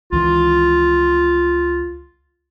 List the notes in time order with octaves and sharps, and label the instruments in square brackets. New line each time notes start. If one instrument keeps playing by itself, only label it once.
[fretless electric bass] C#2 D#3 E3 [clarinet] F4